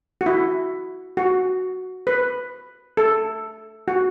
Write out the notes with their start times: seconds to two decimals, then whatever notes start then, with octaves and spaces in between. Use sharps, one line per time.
0.21 F#4
0.26 E4
1.17 F#4
2.07 B4
2.97 A4
3.88 F#4